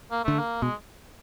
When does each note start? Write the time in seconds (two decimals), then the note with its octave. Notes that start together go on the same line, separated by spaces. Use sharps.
0.11 A#3
0.25 D3 A3
0.39 A#3
0.62 B2 G#3